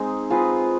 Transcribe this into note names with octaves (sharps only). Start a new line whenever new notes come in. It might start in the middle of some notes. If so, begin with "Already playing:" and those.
Already playing: G#3 C4 D#4 G#4
C4 F4 G#4 B4